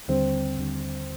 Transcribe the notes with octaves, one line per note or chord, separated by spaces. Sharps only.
D#2 D3 G3 C4
D#2 D3 G3